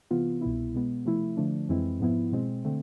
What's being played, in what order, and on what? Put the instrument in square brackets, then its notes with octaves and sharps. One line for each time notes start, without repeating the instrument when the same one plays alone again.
[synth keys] C3 E3 B3 F4
C2 B2 B3 E4
B2 G#3 B3
C3 F3 A3 E4
D3 F3 A3 D4
F2 E3 G#3 C4 E4
G#2 F3 B3 E4
B2 G#3 C4
D3 A3 C4